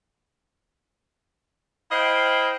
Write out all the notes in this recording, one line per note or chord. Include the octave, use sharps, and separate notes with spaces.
E4 C5 D#5 F5 G5